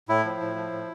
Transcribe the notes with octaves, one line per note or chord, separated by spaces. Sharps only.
A2 E4
F3
A2
F3
A2